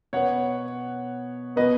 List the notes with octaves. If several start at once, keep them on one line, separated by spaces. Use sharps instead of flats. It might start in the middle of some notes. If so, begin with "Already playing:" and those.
B2 B3 C#5 F#5
B2 B3 B4 D#5